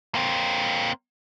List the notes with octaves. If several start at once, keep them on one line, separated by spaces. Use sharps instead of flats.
A#3 C4